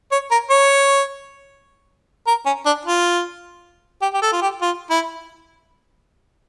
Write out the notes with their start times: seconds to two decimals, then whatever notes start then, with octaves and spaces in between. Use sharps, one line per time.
0.12 C#5
0.31 A#4
0.50 C#5
2.27 A#4
2.45 C#4
2.65 D4
2.85 F4
4.02 G4
4.14 G4
4.22 A4
4.32 F4
4.42 G4
4.62 F4
4.90 E4